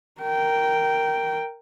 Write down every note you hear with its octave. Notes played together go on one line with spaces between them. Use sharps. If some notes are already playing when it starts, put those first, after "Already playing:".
A#4 G5